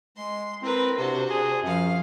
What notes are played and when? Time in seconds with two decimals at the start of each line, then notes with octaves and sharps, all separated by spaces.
0.17 G#3 C6
0.62 C4 E4 A#4 B4
0.99 C3 D4 F#4 C5
1.30 G#4
1.62 F#2 F3 F5